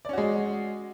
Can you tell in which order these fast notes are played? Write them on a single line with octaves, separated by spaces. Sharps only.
D5 C#4 F#4 G#3